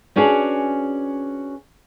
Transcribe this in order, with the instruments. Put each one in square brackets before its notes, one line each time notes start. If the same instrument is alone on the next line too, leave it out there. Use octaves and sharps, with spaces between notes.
[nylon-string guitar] B3 C#4 D4 F#4 G#4